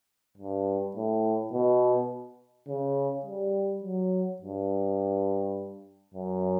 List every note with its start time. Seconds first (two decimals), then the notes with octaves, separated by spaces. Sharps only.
0.37 G2
0.96 A2
1.53 B2
2.68 C#3
3.25 G3
3.83 F#3
4.41 G2
6.14 F#2